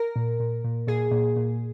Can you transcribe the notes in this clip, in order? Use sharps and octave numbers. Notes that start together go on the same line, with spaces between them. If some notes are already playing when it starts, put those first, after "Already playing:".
Already playing: A#4
A#2
A#2
A#2
A#2 G#4
A#2
A#2